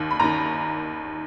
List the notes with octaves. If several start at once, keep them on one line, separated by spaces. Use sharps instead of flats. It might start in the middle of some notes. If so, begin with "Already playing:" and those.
Already playing: D#2 D#3
B5
D#2 D#3 A#5